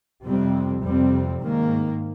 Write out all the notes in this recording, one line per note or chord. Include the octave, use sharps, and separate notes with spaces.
F2 C3 G3 C4
F2 C3 G3 C4
G#2 D#3 A#3